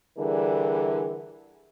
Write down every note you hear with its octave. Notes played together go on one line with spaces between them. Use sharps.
D3 E3 G3 G#4 A#4